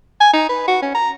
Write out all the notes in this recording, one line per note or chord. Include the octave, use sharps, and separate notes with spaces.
G#5
D#4
B4
F#4
C#4
A#5